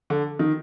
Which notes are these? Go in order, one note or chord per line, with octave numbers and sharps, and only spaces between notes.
D3
D#3